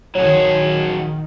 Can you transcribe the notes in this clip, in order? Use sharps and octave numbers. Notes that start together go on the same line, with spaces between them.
A#1 D#3 F#3 G#4 C#5